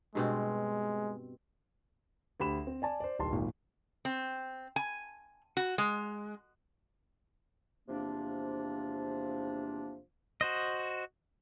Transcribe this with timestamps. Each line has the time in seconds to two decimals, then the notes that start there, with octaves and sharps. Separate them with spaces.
0.15 G2 B2 G#3 C4
2.40 D2 G4 B5 E7
2.67 C4
2.82 D5 G#5 A5
3.00 C5 D5
3.19 D1 B1 A5 C6
3.32 G#1 A#2
4.05 C4
4.76 G#5
5.57 F#4
5.78 G#3
7.89 E2 C3 F3 A#3 D4
10.41 F#4 C5 D#5